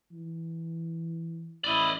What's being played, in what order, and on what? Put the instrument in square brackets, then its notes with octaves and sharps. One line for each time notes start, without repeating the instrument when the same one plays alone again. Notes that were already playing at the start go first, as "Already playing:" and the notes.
[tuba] E3
[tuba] A1 [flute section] E4 B5 [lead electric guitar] D5 D#5